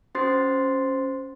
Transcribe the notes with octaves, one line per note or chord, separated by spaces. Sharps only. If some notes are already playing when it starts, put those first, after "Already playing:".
C#4 F#4 C5 C6 A6 C7